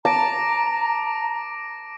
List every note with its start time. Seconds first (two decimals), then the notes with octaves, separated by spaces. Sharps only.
0.05 A5 A#5 D6 A#6 D7